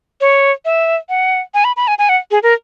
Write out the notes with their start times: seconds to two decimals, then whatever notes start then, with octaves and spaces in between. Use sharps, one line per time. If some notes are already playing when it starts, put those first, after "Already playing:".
0.21 C#5
0.65 E5
1.09 F#5
1.54 G#5
1.64 B5
1.77 B5
1.88 G#5
1.99 G#5
2.09 F#5
2.31 G#4
2.43 A#4